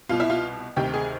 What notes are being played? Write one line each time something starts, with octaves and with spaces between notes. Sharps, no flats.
C2 B2 F4
E4
F4
D2 C3 D#3 G4
G#4